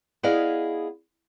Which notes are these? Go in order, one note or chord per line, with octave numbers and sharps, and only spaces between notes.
B3 E4 G#4 D5 D#5 F5